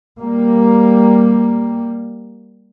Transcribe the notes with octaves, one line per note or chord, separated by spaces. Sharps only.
G3 A#3